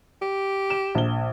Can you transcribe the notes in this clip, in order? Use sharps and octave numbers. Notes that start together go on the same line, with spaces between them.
G4
E7
A#1 G7